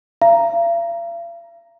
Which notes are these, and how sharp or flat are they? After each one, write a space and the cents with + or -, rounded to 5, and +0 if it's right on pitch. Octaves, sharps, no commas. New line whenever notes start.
F5 -45 A#5 +0